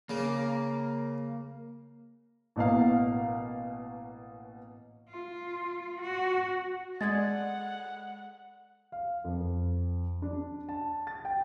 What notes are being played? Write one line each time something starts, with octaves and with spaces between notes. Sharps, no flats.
C#3 A#3
A1 B2 A#3 F5
F4
F#4
G#3 A4 D5 D#5 F#5 G#6 A6
F5
F2
D4
A5
A6
G5